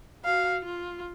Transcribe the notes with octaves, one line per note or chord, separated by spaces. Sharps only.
F#4 F5
F4